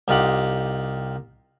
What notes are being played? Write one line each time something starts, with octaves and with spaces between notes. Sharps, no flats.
C2 D#4 F4 G4 F#5